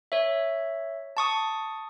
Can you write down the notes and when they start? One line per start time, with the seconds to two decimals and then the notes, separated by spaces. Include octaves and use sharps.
0.12 C#5 E5
1.17 A5 C#6 D#6